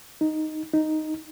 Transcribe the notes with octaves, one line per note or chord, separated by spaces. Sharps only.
D#4
D#4